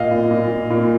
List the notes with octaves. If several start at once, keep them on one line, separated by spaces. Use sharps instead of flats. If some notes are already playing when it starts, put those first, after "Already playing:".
Already playing: A#2 D#5 F5
A#2
A#2
A#2
A#2